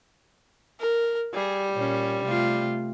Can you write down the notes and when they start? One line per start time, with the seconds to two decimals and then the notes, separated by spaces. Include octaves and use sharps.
0.80 A#4
1.34 G3 G#4
1.72 A#2 C#4
2.24 C3 A3 F4